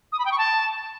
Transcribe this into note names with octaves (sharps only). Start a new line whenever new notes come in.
D#6
B5
G5
C#6
A5